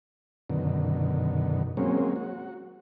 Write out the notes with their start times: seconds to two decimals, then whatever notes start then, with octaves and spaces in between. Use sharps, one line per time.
0.50 F#2 B2 D3 D#3
1.77 F#3 G#3 A#3 C4 C#4
2.16 F#4